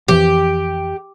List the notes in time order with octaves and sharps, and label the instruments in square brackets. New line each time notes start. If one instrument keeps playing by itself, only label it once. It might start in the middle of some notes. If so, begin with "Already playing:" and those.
[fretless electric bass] F2 E3 F3 [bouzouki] G4